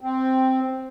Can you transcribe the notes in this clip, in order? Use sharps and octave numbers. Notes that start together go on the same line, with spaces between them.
C4